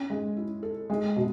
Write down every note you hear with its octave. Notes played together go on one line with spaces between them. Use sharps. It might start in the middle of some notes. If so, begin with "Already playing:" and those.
Already playing: C#4
G#3
E4
A4
G#3
B2